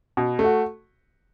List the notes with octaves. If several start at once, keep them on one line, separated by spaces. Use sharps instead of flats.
B2
A3
F#4